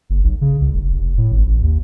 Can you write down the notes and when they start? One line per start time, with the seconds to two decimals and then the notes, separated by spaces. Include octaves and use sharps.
0.10 F#1
0.23 B1
0.41 C#3
0.61 C2
0.74 F1
0.92 F1
1.18 A2
1.32 G#1
1.46 A1
1.62 D#2